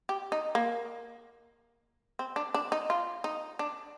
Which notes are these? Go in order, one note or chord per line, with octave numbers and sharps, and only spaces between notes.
G4
D#4
A#3
C4
D4
D4
D#4
F4
D#4
D4